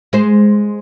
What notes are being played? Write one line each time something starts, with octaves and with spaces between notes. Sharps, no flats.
G#3 C5